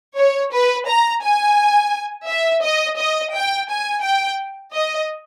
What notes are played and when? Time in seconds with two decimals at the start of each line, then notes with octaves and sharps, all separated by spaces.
0.17 C#5
0.52 B4
0.87 A#5
1.22 G#5
2.28 E5
2.63 D#5
2.98 D#5
3.33 G5
3.69 G#5
4.03 G5
4.73 D#5